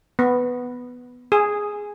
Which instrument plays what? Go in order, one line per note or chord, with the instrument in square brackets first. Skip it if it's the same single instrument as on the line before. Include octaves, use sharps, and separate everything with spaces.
[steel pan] B3
G#4